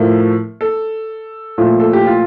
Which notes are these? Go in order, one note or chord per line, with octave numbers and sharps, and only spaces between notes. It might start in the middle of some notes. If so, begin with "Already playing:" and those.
Already playing: A2 F3 A3 A#4
A4
A#2 F3 A3
A4
G4
F4